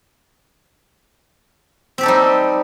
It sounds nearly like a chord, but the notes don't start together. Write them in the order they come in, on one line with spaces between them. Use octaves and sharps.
C4 G4 A4 D#4 G3